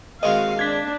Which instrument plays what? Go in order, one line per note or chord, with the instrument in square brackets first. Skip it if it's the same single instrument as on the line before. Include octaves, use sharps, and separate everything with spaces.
[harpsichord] D#3 G#3 C4 [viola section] F#4 F5 [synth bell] D#5
[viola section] D4 [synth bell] G#6 B6